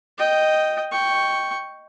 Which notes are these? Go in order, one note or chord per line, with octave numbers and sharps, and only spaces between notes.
D#5 G5
G5 C#6